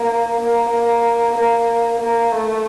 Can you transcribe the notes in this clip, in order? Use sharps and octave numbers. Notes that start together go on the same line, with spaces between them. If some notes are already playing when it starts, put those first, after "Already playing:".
Already playing: A#3
A#3
A#3
A#3
A#3
A3